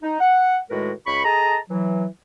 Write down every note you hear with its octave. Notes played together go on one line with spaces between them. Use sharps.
D#4
F#5
A2 D#3 G#3 F#4 A#4 B4
C#2 B5 C#6
G#4 A4 D#5 A5 A#5
E3 F#3